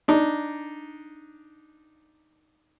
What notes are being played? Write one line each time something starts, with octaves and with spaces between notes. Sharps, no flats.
D4 D#4